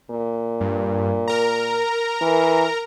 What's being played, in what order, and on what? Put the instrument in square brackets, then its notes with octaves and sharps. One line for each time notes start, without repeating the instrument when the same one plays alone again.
[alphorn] A#2
[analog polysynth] G2
A#4 A#5
[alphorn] E3